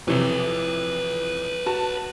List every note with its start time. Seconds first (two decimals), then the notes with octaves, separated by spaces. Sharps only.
0.08 F2 C3 E3 B4 C#5
1.66 F#4 A5